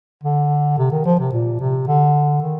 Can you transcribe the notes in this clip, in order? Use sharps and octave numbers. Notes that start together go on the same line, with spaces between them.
D3
C3
D#3
F3
C3
A#2
C3
D3
D#3